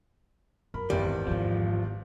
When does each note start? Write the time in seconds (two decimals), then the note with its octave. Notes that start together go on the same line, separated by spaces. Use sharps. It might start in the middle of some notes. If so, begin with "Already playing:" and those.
0.74 F#2 A#4 B5
0.90 G#1 E2 G3
1.27 F2 G#2 F3